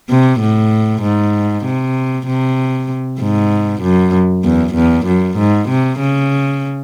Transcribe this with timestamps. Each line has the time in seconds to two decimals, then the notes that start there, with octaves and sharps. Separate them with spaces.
0.10 C3
0.40 A2
1.02 G#2
1.65 C3
2.27 C3
3.20 G#2
3.82 F#2
4.44 E2
4.75 E2
5.06 F#2
5.37 G#2
5.69 C3
5.99 C#3